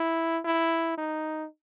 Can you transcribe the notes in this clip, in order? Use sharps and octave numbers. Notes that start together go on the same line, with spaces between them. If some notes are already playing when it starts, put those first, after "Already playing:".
Already playing: E4
E4
D#4